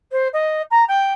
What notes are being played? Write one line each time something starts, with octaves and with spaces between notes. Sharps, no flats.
C5
D#5
A#5
G5